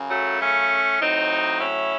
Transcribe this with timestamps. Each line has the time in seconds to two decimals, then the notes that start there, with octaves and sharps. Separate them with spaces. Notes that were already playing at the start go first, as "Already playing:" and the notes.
Already playing: F#2 C#3
0.10 F#3 A3
0.41 A3 C#4
1.00 A2 F#3 C4 D#4
1.60 C#4 E4